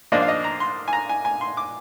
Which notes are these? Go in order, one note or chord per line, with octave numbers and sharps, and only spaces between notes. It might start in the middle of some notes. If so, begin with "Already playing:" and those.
G#2 F3 A#3 D4 F4 D#5
F5
D#5
A#5
C6
G#5
A#5
G#5
G#5
C6
D6